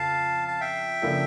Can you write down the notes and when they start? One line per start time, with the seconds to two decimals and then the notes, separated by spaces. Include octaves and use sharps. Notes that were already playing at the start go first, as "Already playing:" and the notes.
Already playing: F2 C#3 F5 A5
0.48 A5
0.60 E5 G5
1.02 C#3 F3 A#3 D4 A4